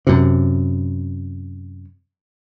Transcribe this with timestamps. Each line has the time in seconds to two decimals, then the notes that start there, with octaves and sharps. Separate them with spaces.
0.07 F#2 C3